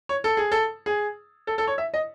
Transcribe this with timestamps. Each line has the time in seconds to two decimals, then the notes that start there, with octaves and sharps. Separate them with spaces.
0.09 C#5
0.24 A4
0.37 G#4
0.52 A4
0.86 G#4
1.47 A4
1.58 A4
1.67 C#5
1.78 E5
1.94 D#5